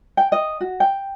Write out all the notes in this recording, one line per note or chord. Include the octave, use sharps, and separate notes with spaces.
G5
D#5
F#4
G5